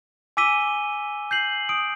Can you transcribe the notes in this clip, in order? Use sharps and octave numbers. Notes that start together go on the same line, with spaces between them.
G#5 D6 E6 B6 D#7 G7
G6 C7 F#7
D#6 D7